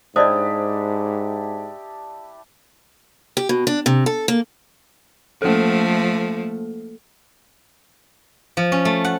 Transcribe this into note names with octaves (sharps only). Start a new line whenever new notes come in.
G#2 D4 E4 G4 C5 D5 D#5 D#6
G4
B2
D4
C3
A4
A#3
F3 A3 A#3 A4
F3
C#4
A3
F#5